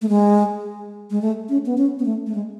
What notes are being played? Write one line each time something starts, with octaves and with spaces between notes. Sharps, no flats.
A3
G#3
G#3
A3
C#4
B3
C#4
B3
A3
A3
G#3